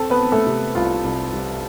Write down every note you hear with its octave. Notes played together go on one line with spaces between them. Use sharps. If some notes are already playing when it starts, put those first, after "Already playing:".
Already playing: C4 A4 A5
B3 B4
C4
A3 A4
C3
C2 F4
C2
G3